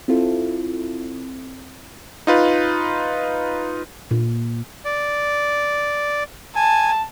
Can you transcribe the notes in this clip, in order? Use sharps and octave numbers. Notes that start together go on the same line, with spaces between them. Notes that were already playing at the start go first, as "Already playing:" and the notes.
C4 E4 F4 A4
D#4 F4 B4
A#2
D5
G#5 A5